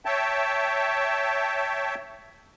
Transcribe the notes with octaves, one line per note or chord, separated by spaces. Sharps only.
C#5 E5 G5 A5